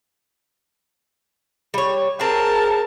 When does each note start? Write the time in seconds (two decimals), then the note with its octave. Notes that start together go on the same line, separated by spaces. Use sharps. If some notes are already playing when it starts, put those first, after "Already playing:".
1.74 G3 C#5
2.20 C4 G#4 A#4 A5